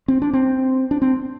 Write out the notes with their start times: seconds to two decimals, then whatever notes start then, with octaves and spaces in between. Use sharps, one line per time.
0.08 C4
0.22 D4
0.33 C4
0.91 D4
1.02 C4